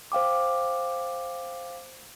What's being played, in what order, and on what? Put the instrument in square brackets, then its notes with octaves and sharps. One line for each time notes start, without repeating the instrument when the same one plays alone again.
[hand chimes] C5 F5 G5 D6